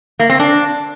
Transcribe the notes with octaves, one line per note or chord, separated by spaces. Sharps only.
A#3
C4
D4